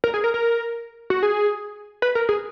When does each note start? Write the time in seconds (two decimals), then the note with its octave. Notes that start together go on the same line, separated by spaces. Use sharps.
0.04 A#4
0.14 G#4
0.24 A#4
0.34 A#4
1.10 F#4
1.23 G#4
2.02 B4
2.15 A#4
2.29 G#4